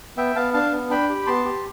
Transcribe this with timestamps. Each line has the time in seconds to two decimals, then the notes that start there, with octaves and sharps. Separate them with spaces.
0.17 B3 E5 G5
0.36 B3 F5 A5
0.53 D4 F5 A5
0.72 B3
0.90 D4 G5 B5
1.09 G4
1.26 B3 A5 C6
1.45 G4